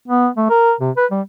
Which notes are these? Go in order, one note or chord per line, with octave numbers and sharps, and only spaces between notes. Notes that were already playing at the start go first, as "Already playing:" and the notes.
B3
A3
A#4
C3
B4
G3